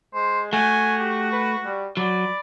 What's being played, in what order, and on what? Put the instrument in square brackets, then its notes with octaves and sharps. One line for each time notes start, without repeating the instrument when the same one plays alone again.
[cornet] G#3 [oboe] C5
[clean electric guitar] A3 [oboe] F#4 [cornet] G#5
[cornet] G4
B4
G3
[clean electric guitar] F#3 [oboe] D5 [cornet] B5